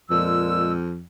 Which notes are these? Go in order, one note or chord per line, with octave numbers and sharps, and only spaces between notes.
F2 A#2 G#3 E6